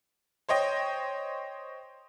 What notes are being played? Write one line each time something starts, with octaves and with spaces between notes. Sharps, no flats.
C5 C#5 D#5 G5